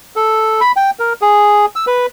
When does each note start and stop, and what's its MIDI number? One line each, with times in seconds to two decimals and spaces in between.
0.16 0.60 69
0.61 0.72 83
0.76 0.91 79
0.99 1.13 70
1.22 1.66 68
1.76 1.85 88
1.87 2.06 71